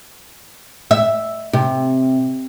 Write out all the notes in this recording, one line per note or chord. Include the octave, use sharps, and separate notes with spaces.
E5
C3